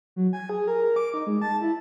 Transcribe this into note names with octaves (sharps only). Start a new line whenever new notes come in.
F#3
G#5
G#4
A#4
D6
D#4
G#3
A5
E4